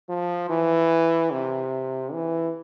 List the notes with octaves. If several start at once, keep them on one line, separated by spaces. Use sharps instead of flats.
F3
E3
C3
E3